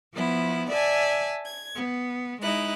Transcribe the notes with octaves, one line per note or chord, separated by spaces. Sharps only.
F3 B3 E4
D5 E5 G#5 A5
G#6
B3
G#3 D#4 E4 F#6